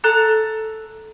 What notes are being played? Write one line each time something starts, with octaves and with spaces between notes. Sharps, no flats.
A4 A#5 F#6